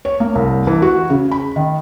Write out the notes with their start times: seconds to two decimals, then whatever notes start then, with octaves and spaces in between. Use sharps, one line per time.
0.05 C#5
0.20 A#3
0.35 C2
0.67 E3
0.82 F#4
1.10 C#3
1.31 B5
1.56 D#3